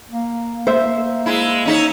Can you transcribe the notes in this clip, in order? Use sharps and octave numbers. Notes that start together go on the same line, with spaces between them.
A#3
A#3 C5 E5
G#3 E4
C#4 D#4 E5